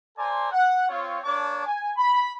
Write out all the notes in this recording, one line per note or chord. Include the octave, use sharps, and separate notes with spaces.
A4 C5 D5 G#5 A#5 C6
F#5
C4 F4 C#5
A#3 D4 C#5 A5 D6
G#5
B5